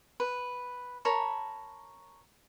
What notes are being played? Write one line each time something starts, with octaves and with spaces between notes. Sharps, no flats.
B4
A#4 C#5 A5 B5